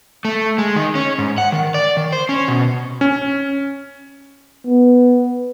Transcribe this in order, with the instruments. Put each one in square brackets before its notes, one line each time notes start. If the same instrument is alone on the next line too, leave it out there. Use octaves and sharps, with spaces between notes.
[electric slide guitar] A3
G#3
D#3
C#4
G#2
F#5
D#3
D5
D#3
C5
C#4
B2
[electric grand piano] C#4
[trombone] B3